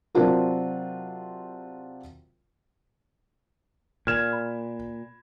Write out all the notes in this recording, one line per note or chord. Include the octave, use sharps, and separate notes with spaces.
C3 F#3 C4 D4 F4 A#4
A#2 F6 G#6 E7
B5